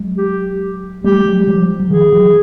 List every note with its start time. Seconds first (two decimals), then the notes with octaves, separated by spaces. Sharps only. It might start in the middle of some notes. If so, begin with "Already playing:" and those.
Already playing: F#3 G#3
0.18 G4
1.04 G3 A3 G4
1.25 F#3 G#3
1.47 F3 G3
1.79 F#3
1.90 D#3 F3 G#4
2.12 E3 F#3